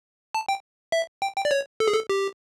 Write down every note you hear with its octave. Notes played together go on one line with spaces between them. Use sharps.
A5
G5
E5
G5
G5
D5
C#5
A4
G#4
A4
G4